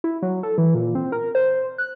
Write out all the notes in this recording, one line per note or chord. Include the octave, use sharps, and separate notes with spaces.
E4
F#3
A4
E3
A#2
C4
A#4
C5
F#6